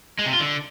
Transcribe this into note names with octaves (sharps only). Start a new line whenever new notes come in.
G#3
C3
F4
D3